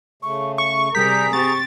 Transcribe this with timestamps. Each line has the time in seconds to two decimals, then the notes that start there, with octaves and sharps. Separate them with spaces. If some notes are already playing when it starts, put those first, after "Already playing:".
0.23 C#3 A3 C#6
0.58 C#6 C#7
0.95 C3 G3 G#4 A#4 A#5 G6 B6
1.33 C4 G4 C#6 A6